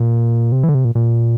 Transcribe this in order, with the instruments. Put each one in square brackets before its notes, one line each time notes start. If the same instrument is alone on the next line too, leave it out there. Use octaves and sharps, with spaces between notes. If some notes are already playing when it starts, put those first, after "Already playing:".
Already playing: [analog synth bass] A#2
C3
E3
D3
C3
A#2
A#2